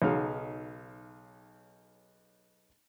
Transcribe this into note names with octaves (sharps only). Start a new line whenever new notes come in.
B1 C#3 F#3 D#4 F5